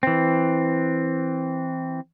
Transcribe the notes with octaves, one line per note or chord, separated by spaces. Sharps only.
E3 C4